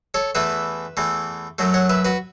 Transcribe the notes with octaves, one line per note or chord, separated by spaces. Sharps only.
A4 C#5
E2 E3 A3 B4 E5
E2 E3 A3
F#2 F#3 A3
C#5 F#5
B4 E5
F#4 B4